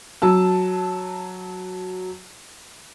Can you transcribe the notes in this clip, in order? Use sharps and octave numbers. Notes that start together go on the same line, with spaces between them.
F#3 A5 E6